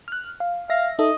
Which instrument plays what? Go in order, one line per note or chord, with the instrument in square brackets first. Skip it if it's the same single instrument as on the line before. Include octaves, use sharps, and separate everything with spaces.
[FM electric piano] F6 F#6
F5
[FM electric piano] E5 A#6 [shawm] F5
[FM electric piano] D#4 A4 E5 [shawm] D#5